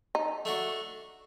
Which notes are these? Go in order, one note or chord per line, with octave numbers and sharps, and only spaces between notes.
D#4
A3 D4 F#4